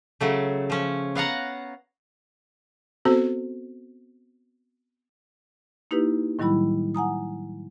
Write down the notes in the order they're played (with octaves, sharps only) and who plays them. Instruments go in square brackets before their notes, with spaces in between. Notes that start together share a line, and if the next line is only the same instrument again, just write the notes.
[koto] C#3 F#3 A3
F3 C#4
B3 F5 F#5 A#5
[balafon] B3 C4 F#4 A4 C5
[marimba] A#3 D#4 E4 G4 B4
A2 D#3 F#3 G3 E4 B5
F#5 G#5 A#5 D#6